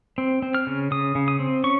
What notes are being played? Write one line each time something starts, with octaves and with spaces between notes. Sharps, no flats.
C4
C4
F6
C#3
C#3 D#6
C#3
D#6
C4
C#4 C#6